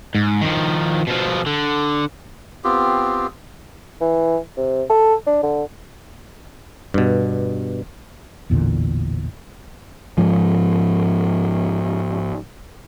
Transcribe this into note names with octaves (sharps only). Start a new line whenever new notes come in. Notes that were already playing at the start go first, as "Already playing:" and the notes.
G#2
D#3 F3
B2 F3
D3
B3 C4 F4 G4
E3
C3
A4
D4
D3
G2 B2
A1 E2 A#2 D3
G#2 F3